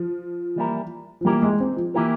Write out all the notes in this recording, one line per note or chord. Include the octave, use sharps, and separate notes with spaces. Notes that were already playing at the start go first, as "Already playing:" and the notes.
Already playing: F3
E3 G3 A#3 E4 A#4
F3
E3 G3 A#3 E4 G4 A#4
G#3
C4
F3
E3 A#3 E4 G4 A#4